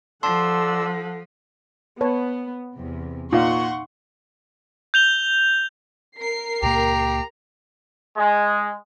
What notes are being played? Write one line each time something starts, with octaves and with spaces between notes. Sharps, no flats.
F3 A4 D5 F#5 A5 C6 E6
B3 B4 C#5 A5
E2 C3
A#2 D#4 F5 F#5 C6 C#6
G6 F7 G7
A#4 C7
C#2 A#2 A#3 G4 A#5
G#3